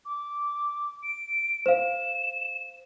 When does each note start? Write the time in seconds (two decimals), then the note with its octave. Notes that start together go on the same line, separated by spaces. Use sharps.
0.05 D6
1.03 D7
1.66 C5 F5 E7